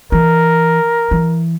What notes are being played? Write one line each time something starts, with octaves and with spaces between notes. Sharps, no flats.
E3 A#4
E3